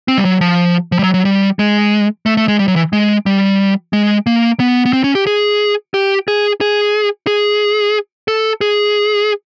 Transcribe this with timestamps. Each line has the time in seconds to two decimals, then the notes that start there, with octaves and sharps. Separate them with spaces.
0.08 C4
0.18 G3
0.25 F#3
0.41 F3
0.92 F3
0.99 G3
1.03 F#3
1.14 F#3
1.25 G3
1.59 G#3
2.26 A3
2.37 A3
2.48 G#3
2.59 G3
2.68 F#3
2.76 E3
2.93 G#3
3.26 G3
3.93 G#3
4.27 A#3
4.60 B3
4.86 B3
4.93 C4
5.04 C#4
5.15 G4
5.27 G#4
5.94 G4
6.28 G#4
6.61 G#4
7.27 G#4
8.28 A4
8.61 G#4